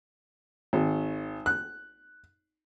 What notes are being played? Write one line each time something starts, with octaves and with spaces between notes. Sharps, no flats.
G#1
F#6